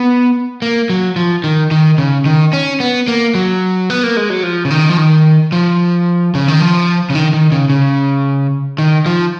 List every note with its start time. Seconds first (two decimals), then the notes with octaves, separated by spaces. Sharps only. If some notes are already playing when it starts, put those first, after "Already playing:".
Already playing: B3
0.62 A#3
0.90 F#3
1.16 F3
1.44 D#3
1.71 D#3
1.98 C#3
2.26 D#3
2.53 C#4
2.80 B3
3.08 A#3
3.35 F#3
3.90 B3
4.03 A#3
4.17 G#3
4.30 F#3
4.43 F3
4.65 C#3
4.70 D#3
4.89 F3
4.97 D#3
5.52 F3
6.35 C#3
6.48 D#3
6.60 F3
7.10 C#3
7.15 D#3
7.33 D#3
7.52 C#3
7.70 C#3
8.78 D#3
9.06 F3